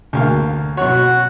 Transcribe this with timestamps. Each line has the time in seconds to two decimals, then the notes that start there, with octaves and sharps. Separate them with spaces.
0.13 D2 A#3 F5
0.77 B2 F#3 F#4 C#5